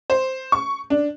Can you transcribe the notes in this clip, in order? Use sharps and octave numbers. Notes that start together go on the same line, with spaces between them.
C5
C#6
D4